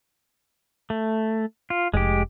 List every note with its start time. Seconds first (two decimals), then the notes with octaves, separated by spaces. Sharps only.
0.90 A3
1.70 F4
1.94 F1 G#3 G4